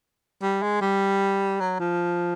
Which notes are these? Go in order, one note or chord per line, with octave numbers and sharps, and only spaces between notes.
G3
G#3
G3
F#3
F3